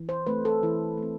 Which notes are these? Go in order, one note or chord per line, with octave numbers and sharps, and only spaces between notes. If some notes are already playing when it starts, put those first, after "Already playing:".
Already playing: E3
C5
A3 C4 B4
A4
E3 E4
A3 C4